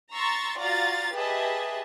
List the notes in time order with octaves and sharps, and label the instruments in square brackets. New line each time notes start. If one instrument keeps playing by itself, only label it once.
[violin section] A#5 C6 C#6 E6 A6
F4 F#4 D5 F5 A#5 A6
G4 G#4 B4 D#5 E5 A5